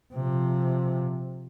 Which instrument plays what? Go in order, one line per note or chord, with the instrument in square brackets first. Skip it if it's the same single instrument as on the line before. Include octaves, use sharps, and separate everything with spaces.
[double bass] C3 F3